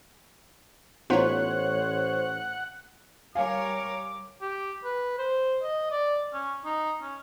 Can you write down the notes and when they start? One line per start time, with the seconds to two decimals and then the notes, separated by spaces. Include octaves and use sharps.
1.10 A1 B3 D#4 F4 C5 C#5 F#5
3.35 G3 A#4 C#5 F5 G#5 D6
4.41 G4
4.85 B4
5.19 C5
5.63 D#5
5.91 D5
6.34 C#4
6.65 D#4
7.03 C#4